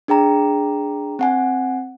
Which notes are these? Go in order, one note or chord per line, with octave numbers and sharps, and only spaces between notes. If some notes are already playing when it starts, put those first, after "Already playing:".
D4 G#4 G5 A#5
C4 F#5 G#5